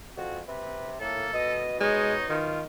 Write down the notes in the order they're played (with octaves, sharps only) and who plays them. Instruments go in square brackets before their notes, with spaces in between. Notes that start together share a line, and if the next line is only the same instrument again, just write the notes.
[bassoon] F2 [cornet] F#4
[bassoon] C3 [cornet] B4
[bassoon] A2 [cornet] A#3 [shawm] A4
[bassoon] B2 [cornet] D#5
[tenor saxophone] G#3 [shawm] D#4 [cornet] C#5
[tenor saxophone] D#3 [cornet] F4